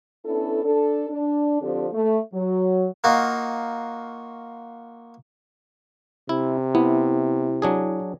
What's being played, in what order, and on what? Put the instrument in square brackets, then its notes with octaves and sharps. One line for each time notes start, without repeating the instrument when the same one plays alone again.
[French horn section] B3 C#4 D4 E4 A4
D4 A4
D4
D3 F3 C4 D4 G4 A4
A3
F#3
[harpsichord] A#3 D#4 F4 F#4
[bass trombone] C3 [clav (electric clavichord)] E4
[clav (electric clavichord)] B3 [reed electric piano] E4
[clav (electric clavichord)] F#3 D4 G#4